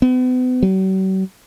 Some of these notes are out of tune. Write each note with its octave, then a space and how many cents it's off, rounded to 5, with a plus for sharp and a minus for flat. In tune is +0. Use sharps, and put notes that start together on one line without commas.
B3 +40
F#3 +45